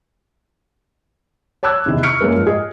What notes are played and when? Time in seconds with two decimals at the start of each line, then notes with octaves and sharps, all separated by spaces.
1.63 C#5 A5 D6 E6 F#6 G#6
1.86 E2 C3 D#3
2.03 C#6 F6 C#7 D7
2.21 F#2 G#3 A#3 A#4 B4
2.34 G#2 F3
2.47 G#4 D#5